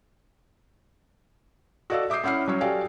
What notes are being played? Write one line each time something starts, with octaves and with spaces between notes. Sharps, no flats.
F#4 A4 D5 D#5 F5 E6
E5 D6 D#6 G6 C7
C#4 E4 F#5 F6 C7
F#3 C#4 C#5
F#4 G4 A4 D5 F5 G#5